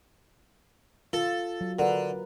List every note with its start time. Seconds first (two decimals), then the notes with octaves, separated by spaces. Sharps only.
1.13 F4 A4
1.61 F#3
1.79 D3 A#4 B4